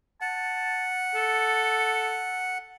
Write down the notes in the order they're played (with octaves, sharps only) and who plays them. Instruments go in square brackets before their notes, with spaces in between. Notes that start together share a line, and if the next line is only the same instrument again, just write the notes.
[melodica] F#5 [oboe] A5
[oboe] A4